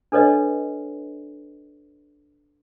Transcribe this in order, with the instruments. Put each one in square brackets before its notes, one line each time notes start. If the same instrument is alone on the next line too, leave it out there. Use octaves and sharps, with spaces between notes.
[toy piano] D4 A4 B4 C#5 D#5